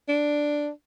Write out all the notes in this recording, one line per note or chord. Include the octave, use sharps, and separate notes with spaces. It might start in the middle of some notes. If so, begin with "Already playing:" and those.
D4